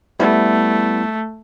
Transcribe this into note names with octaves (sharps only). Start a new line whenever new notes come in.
G3 A3 B3 E4